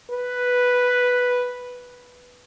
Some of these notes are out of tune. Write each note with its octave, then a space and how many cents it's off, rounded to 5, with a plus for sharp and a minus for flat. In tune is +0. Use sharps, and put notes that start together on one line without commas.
B4 +0